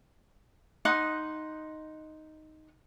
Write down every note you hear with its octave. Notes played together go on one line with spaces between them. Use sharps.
D#4 F#5 C6 D#6